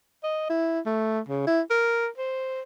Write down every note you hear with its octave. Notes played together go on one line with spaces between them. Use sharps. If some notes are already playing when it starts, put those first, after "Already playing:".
D#5
E4
A3
C#3
E4
A#4
C5